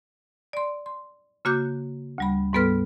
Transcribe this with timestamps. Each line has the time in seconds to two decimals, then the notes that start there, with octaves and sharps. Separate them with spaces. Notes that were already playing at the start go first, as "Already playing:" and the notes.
0.53 D5 C6
0.86 C6
1.45 C#3 A#3 F#4 D6 F#6 G6
2.18 D2 G3 B5
2.53 G#2 G3 B3 A4 B4 F6